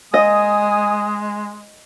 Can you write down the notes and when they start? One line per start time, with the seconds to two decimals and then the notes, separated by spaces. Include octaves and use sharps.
0.14 G#3 D#5 G#5 D#6